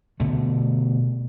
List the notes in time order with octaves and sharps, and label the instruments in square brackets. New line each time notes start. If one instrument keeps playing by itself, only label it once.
[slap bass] B2 D3 A3